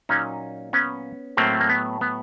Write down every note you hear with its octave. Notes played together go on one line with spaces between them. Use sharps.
A#2 F#3 A#3 C#4 D#4
B3 C#4
A2 F#3 A3 A#3 C4
A#3
B3
B3